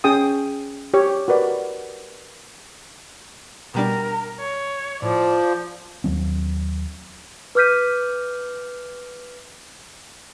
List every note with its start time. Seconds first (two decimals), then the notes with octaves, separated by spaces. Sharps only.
0.04 C#4 G#4 G5 D#6
0.94 G4 C#5
1.28 F#4 A#4 B4 D5
3.74 B2 G3 D4 A#4
4.39 C#5
5.02 A2 F3 D5
6.04 D#2 F#3 C4
7.55 B4 D6 F6 G6 B6 D#7